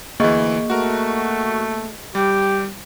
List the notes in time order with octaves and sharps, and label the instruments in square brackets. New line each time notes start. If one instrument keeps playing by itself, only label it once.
[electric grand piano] D2 E3 [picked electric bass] A#3 [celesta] G#4 D#5 C#6
[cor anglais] A3 [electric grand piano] F#4 A#4
[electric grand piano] G3 [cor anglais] G4